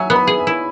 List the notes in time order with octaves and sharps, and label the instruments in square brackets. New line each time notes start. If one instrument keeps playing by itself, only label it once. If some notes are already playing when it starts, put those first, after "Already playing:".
Already playing: [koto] F#3 [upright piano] C#5 E5 G#5
[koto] B3
[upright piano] B5
[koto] G#4
[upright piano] G#5
[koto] E4